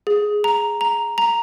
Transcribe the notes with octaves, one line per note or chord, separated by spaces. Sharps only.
G#4
A#5
A#5
A#5